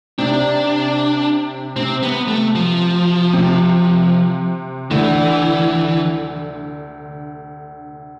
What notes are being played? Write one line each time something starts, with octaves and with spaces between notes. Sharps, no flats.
C3 D4
C3 C4
B3
A3
F3
C3
D2 D3 E3